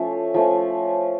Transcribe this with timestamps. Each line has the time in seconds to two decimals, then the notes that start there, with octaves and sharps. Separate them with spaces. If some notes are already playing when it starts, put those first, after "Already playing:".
Already playing: F3 A3 C#4
0.34 F3 A3 C#4